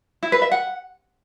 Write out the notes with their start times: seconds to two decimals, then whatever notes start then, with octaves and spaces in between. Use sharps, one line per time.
0.23 E4
0.32 B4
0.42 E5
0.51 F#5